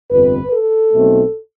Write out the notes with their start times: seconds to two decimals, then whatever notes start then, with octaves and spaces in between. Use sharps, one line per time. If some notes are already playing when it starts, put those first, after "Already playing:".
0.11 G1 F2 C3 B4
0.52 A4
0.93 B1 B2 A3 C4